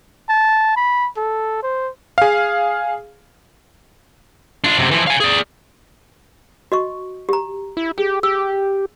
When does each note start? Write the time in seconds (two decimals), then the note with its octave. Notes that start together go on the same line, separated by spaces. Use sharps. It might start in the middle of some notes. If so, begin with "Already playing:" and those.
0.29 A5
0.76 B5
1.17 A4
1.63 C5
2.18 G#4 F5
4.64 D4 F4
4.78 F#2 C3
4.91 E3 F3
5.07 F5 G#5
5.20 G#4 D5
6.72 F#4 D#5 C#6
7.29 G4 A#5
7.77 E4
7.98 G4 G#4
8.23 G4 E6